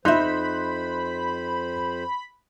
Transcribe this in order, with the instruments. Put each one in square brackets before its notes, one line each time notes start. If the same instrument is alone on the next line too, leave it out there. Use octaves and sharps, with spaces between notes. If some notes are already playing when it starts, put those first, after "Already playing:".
[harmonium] F2 C5 [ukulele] D#4 E5 [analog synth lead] B5 [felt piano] C6 F#6 G6